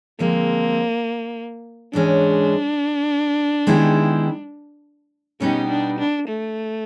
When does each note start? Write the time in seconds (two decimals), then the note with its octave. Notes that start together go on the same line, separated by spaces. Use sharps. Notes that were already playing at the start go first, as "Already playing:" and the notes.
0.19 D3 F3 G#3 A#3 C4
1.93 G#2 E3 G#3 C#4 D4
3.67 D#3 G#3 B3 E4 G4
5.40 B2 G3 B3 C#4 D#4 G4
5.70 D4
5.99 D4
6.28 A3